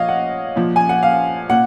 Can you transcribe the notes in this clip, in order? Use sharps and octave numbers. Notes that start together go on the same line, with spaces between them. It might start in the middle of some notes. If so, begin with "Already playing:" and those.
Already playing: A#2 F3 C#5 D#5 F5
F#5
A#2 F3
G#5
F#5
F5
A#2 F#5